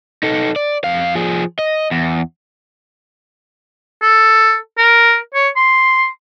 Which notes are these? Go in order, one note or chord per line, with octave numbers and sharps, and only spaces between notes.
D#4 A4
D5
F2 F5
F3 G#4
D#5
E2
A4
A#4
C#5
C6